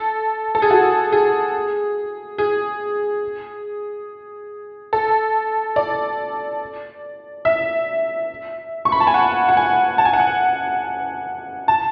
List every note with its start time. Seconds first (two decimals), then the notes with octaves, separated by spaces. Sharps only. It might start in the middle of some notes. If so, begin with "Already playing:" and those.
Already playing: A4
0.55 A4
0.62 G#4
0.70 F#4
1.12 G#4
2.38 G#4
4.93 A4
5.76 D5
7.45 E5
8.85 C#6
8.92 B5
9.00 A5
9.07 G#5
9.14 F#5
9.49 F#5
9.57 G#5
9.98 A5
10.05 G#5
10.13 F#5
10.20 G#5
11.68 A5